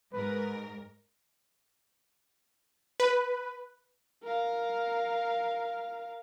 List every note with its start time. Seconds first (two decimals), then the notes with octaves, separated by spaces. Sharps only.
0.13 G#2 A#4 B4
3.00 B4
4.24 A#4 F5